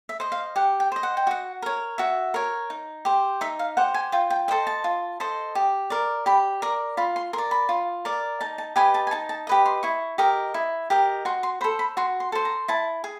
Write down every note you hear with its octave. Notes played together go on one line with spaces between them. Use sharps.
E5
C5 D#5
F5
G4 F#5
G5
C5 D#5
F#5
G5
F#4 F#5
A#4 C#5
F#4 E5
A#4 C#5
D#4
G4 C5
D#4 E5
F5
G4 C5 F#5
G#5
F4 G5
G5
A4 C5 D#5 G5
A5
F4
A4 C5 D#5
G4
A#4 D5
G4 B5
A#4 D5 A#5
F4 B5
C6
A#4 C6
D5
B5
F4
A#4 D5
D#4 A5
A5
G4 B4 D#5 G#5
A5
G#5
D#4 A5
A5
G4 B4 D#5
C6
E4 C#6
G4 A#4 D#5
E4
G4 A#4 D#5
F#4 C6
C6
A4 C5 B5
B5
F#4 C6
C6
A4 C5
A#5
E4 A5
G#4